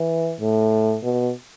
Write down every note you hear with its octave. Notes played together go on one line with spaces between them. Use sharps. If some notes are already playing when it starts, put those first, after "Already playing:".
Already playing: E3
A2
B2